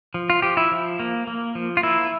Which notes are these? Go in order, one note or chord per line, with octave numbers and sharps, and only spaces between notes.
F3
F4
F3 G4
E4
F3
A#3
A#3
F3
F4
A#3 E4